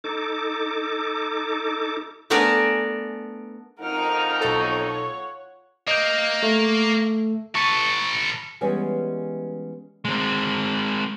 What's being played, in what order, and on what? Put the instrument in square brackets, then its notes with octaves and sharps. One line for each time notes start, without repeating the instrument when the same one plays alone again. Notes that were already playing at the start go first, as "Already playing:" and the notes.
[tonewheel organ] D#4 A4 D6
[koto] A3 B3 D4 A#4 D5 G#5
[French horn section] F2 D#4 [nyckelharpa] F4 F#5 [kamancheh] A#4 F6
[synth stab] B1 A4 [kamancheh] C#5
[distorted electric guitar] A#3 [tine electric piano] D#5 G6
[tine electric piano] A3
[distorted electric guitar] A4 B4 [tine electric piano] C#6
[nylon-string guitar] E3 G3 G#3 B3 C#4 C#5
[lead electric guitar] G#3 C4